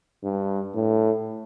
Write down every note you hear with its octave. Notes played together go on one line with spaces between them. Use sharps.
G2
A2